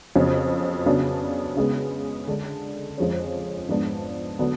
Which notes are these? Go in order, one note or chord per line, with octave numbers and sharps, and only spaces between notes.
F2 C#3 F#3 B3
C#3 F#3 B3 D4
C#3 G#3 B3
D3 G#3 D4
F2 F3 G#3 C#4
G#2 F3 B3 D4
D3 F#3 B3 D4